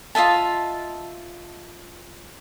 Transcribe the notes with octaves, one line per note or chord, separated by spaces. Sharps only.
F4 D#5 E5 A5